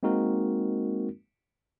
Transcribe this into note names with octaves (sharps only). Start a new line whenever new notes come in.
G#3 A#3 C4 D#4 F#4 A#4